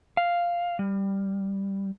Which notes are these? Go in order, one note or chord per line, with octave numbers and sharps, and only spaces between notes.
F5
G3